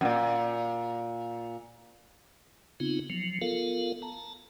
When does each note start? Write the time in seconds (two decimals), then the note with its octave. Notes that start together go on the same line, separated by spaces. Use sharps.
0.01 F#2 A#2
2.80 C#3 B3 C4 D#4 F4
3.10 F3 F#3
3.41 B3 F4 A4 A#4 F5
4.02 A5 A#5